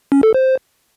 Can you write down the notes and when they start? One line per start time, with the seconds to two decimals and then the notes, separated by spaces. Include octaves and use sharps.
0.12 C#4
0.23 A4
0.34 C5